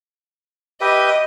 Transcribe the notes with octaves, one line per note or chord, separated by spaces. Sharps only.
G4 B4 D#5 E5